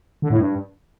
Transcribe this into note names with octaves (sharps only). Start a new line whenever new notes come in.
D3
A2
G2